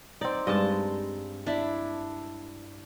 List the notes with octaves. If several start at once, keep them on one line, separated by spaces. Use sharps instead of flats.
C4 D#4 D5
G2 G#3 D#5 A5
D4 E4